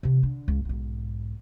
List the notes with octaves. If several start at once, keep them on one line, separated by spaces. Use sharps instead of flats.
C3 F3
D3
C#2
B1 G#2